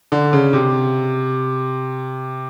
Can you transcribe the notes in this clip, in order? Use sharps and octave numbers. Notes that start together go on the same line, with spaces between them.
D3
C#3
C3